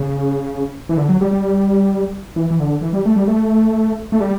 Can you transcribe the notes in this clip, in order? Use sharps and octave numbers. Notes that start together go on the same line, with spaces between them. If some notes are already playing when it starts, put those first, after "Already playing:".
Already playing: C#3
E3
D3
F#3
G3
G3
E3
E3
D3
E3
G3
A3
G3
A3
A3
G3